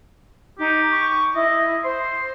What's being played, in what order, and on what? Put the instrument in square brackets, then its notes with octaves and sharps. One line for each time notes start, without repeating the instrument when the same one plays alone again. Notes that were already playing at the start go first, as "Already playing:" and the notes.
[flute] D#4 [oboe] G4
[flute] C#6
[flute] E4 [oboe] D#5
[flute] C5 [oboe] C6